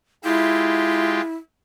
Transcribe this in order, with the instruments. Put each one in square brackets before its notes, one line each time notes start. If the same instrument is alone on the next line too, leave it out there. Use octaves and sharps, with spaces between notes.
[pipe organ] G#3 F4 G4 [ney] E4